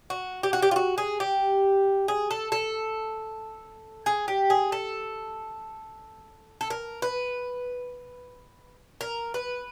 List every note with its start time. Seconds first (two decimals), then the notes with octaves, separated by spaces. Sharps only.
0.10 F#4
0.43 G4
0.53 F#4
0.62 G4
0.71 F4
0.76 F#4
0.98 G#4
1.20 G4
2.08 G#4
2.31 A4
2.52 A4
4.06 G#4
4.28 G4
4.50 G#4
4.72 A4
6.61 A4
6.70 A#4
7.02 B4
9.01 A#4
9.34 B4